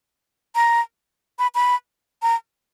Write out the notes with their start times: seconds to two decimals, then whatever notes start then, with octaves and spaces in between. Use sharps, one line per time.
0.55 A#5
1.39 B5
1.55 B5
2.23 A#5